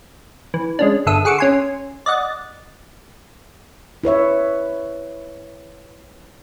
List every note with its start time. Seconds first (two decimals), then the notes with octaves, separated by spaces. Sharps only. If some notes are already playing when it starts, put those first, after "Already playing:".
0.54 E3
0.79 G#3 C#4 D4
1.06 G1 D3 A4 E5 D#6
1.25 G#4 F#5 C#6 D6 E6
1.38 C#4 G#5 C6
2.06 D5 D#5 F#5 A6
4.04 E4 B4 C#5 E5